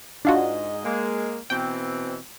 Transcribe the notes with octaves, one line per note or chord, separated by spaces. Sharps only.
G#2 D4 F4 F#4 D#5
G#3 A#3
B2 E3 C4 G5